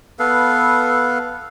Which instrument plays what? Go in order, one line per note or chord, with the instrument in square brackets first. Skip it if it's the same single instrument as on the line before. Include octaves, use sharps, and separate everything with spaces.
[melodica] B3 A4 B4 F5